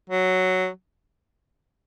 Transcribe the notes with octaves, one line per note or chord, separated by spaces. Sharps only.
F#3